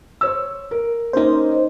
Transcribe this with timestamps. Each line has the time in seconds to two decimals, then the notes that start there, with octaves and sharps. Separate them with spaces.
0.21 C5 C#5 E6
0.71 A#4
1.13 A#3 C#4 D#4 C5 D#5